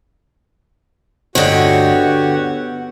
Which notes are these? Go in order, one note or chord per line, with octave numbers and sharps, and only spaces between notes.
G1 D2 D3 F#4 G4 C#5 D#5 F#5
B3